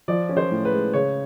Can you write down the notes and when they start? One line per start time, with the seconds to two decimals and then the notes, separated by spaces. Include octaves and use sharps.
0.08 F3 D5
0.29 C#4
0.37 C5
0.51 A2
0.65 B4
0.72 G#3
0.93 C#3 C#5